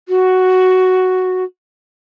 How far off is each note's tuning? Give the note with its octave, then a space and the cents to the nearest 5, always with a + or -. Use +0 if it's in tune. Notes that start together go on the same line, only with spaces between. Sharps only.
F#4 +5